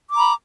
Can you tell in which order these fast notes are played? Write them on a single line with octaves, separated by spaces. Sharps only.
D6 A#5 B5